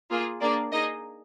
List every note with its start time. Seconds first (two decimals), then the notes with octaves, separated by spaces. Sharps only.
0.10 A#3 F4 G#4
0.41 A#3 D4 G#4 D5
0.72 A#3 D#4 G#4 D#5